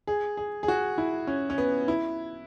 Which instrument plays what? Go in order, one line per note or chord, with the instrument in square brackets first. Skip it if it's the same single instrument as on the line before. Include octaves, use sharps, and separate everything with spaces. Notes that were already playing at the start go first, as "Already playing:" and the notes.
[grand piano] G#4
G#4
G#4
F#4
E4
C#4
C#4
B3
E4